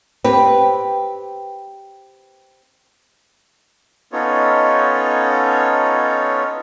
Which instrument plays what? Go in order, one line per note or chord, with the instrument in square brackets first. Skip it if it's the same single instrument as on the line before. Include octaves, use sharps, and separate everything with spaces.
[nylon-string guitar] C4 G4 B4
[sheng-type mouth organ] B3 C#4 D#4 F4 A4 C#5